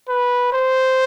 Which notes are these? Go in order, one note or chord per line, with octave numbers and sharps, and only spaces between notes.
B4
C5